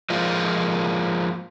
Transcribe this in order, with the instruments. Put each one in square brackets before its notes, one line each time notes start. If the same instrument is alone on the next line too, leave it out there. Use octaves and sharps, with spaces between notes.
[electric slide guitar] F3 G#3 A#3 F4